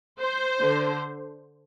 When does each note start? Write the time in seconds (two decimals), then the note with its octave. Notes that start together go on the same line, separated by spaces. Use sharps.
0.19 C5
0.61 D3